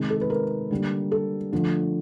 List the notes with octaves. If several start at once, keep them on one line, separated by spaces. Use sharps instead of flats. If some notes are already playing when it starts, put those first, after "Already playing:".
Already playing: C3 D#3 G#3
A4
B4
A#4
D3 G3 A#3
A4
D3 F3 A3